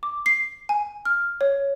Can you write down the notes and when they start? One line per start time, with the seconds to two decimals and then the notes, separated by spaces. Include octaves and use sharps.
0.03 D6
0.26 C7
0.69 G#5
1.05 F6
1.41 C#5